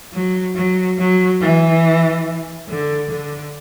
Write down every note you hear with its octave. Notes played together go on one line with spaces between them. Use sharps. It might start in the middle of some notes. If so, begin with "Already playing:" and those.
F#3
F#3
F#3
E3
D3
D3